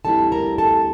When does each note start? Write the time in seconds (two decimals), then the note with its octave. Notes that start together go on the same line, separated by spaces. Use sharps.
0.05 D2 D3 G3 C4 E4 A4 A5
0.32 A#4 A#5
0.58 A4 A5